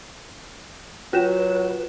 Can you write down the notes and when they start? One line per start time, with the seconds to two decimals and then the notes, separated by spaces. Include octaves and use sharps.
1.13 F#3 F4 F#4 B4 E7